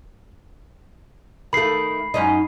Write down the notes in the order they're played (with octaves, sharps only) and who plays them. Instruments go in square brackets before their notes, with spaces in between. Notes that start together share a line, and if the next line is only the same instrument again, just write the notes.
[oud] D#3 A3 [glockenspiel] B5 C7
[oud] F#2 C#4 D#4